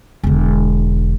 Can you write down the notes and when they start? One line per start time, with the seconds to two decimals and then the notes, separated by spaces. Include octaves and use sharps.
0.24 E1 D3